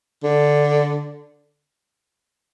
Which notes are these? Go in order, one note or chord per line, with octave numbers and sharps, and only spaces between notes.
D3